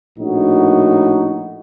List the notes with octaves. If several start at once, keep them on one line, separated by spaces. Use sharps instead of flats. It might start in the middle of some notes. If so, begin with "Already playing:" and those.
A#1 A2 D#4 F#4